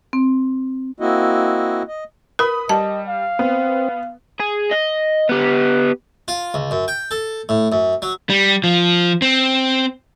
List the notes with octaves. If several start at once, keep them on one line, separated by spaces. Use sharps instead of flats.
C4
A#3 C4 E4 F#4 D#5
D#5
A#4 B4 B5 D#6
G3 D#5 A5
F5
B3 C4
G#4
D#5
B3 G4
F4
C#2
F#2
G5
A4
A2
F#2
F#3
G3
F3
C4